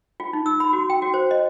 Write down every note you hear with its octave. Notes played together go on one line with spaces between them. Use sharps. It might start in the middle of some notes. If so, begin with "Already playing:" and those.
F4
D#4
E6
B5
F#4
G5
F#4
C5
D#5